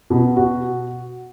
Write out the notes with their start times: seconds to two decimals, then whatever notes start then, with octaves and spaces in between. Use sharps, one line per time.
0.10 B2
0.37 F#4